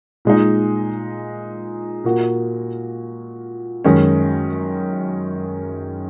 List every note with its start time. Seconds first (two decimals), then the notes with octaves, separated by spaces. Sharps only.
0.25 A#2 G#3 D#4
2.04 A#2 A#3 F#4
3.85 F#2 D#3 G#3 C#4